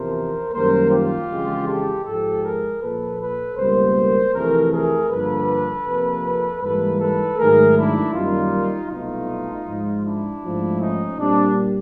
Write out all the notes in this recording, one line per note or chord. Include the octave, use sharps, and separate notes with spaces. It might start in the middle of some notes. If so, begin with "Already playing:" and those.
Already playing: E2 C3 F3 A#4 C5
F#2 D#3 G3 A#3 A#4 C5
F4 G4
F2 C#3 E3 G#3
G4 A4
G#2 F3 G#3 G4 A4
G#4 A#4
A#2 F3 A#3 A4 B4
A4 B4
C#2 B2 G3 A#3 A#4 C5
F2 C3 E3 A3 G#4 A#4
G#4 A#4
G2 D3 F3 A#3 A4 B4
F2 C3 F3 A#3
G#2 E3 G3 A#3 A4 B4
A4 B4
G#2 D#3 F#3 A3 G#4 A#4
D4 E4
F#2 D#3 G3 A#3 D#4 F4
C2 B2 F#3 A3 D#4 F4
G#2 F3 G#3
D4 E4
G#2 F3 A3
C#4 D#4
A#2 G3 A#3 C4 D4